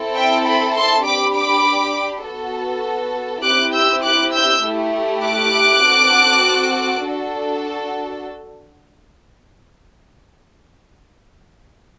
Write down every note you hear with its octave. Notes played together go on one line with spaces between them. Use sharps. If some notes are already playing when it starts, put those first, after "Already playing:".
Already playing: C4 E4 A4
E5 G5
G5 B5
A5 C6
D4 G4 B5 D6
B5 D6
B3 F#4 A4
C4 E4 G4 D6 F#6
E6 G6
D6 F#6
E6 G6
A3 E4 G4
D6 F#6
C4 F#4 A4
D4 F#4 A4